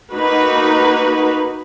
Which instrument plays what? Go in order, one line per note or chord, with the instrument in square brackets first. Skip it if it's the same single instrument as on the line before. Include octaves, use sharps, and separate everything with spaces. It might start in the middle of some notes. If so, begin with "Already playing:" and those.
[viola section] A#3 D#4 F#4 B4